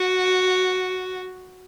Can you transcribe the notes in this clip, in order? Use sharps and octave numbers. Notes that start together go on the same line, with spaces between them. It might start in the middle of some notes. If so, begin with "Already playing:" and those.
Already playing: F#4